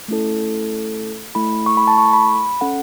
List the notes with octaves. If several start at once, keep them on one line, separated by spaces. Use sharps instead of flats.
A3 C#4 E4 A4
A3 E4 A4 B5
C#6
B5
A5
C#6
B5
C#4 A4 F#5